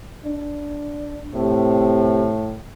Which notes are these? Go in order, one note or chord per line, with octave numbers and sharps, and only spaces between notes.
D4
A2 C3